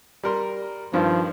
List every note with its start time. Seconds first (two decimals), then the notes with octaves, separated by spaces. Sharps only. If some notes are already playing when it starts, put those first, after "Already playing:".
0.23 G3 A#4 C6
0.94 G2 D#3 F3